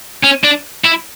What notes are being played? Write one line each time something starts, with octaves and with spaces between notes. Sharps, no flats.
C#4
D4
E4